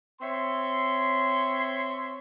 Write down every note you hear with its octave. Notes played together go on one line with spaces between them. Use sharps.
C4 C#5 E5 C6